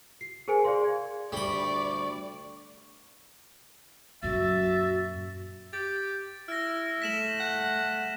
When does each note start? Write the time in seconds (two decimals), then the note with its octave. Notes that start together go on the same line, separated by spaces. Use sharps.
0.21 C7
0.48 G#4 A#4 C5 G#5 C#7 D7
0.65 G#4 D5 F5 C6
0.84 G#6
1.32 D2 G3 D5 B5 C#6
4.23 F#2 A#2 F#4 E5 A6
5.73 G4 A6
6.48 E4 F6 A#6
7.02 A3 B6 E7 F#7
7.40 F#5